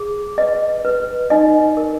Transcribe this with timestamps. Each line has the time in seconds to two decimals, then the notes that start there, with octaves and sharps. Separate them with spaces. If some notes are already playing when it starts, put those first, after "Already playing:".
Already playing: G#4
0.38 B4 D#5
0.85 B4
1.30 D#4 D#5
1.77 A#4